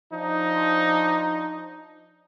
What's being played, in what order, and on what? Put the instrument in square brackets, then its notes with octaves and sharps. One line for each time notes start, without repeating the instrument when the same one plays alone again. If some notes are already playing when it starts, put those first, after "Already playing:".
[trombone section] F3 D4 D#4